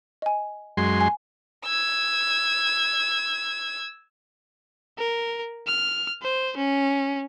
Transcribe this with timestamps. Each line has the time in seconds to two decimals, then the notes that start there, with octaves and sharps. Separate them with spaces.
0.22 D#5 G#5
0.77 F#2 G#3 C6
1.01 G#5
1.65 E6 G#6
4.98 A#4
5.67 F6
6.22 C5
6.57 C#4